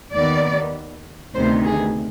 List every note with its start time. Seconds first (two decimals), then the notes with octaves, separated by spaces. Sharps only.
0.15 D#2 D#3 B3 D5
1.34 D2 C3 D#3 B3 C5
1.65 G#4